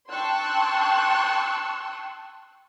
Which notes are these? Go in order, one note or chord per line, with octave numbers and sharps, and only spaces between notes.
G5 A5 C6 C#6 E6 F#6